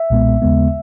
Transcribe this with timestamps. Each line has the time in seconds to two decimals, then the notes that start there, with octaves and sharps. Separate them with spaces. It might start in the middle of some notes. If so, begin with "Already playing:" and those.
Already playing: E5
0.10 B1 A#2 G#3 B3
0.42 D#2 C#3 G#3 B3